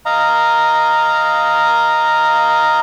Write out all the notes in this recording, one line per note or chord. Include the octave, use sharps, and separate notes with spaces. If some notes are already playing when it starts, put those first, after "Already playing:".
D#5 F5 A#5